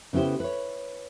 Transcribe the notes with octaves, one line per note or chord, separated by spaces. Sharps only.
C#3 B3 E4 G4 C5
B4 C#5